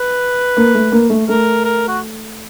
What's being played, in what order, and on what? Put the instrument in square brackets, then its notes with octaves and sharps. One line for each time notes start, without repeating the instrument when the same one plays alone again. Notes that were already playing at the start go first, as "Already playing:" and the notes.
Already playing: [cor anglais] B4
[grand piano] A#3
A3
A#3
A3
[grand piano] A3 [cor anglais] A#4
[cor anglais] A#4
F#4